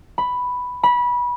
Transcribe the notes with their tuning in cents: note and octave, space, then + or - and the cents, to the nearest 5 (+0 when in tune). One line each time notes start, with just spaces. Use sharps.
B5 +5
B5 -20